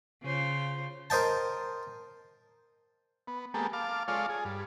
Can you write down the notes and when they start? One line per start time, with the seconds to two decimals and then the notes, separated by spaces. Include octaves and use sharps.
0.22 C#3 F4 C5
1.10 A#4 C5 D#5 G5 A5
3.27 B3
3.54 G#3 A#3 B3 G4 A4
3.73 F5 A5 D6
4.08 G#3 F4 A4 C#5 D5 F5
4.29 G#4
4.45 G2